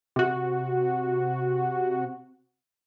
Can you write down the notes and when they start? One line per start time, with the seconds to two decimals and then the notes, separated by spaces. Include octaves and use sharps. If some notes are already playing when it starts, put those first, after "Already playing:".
0.16 C3 F#4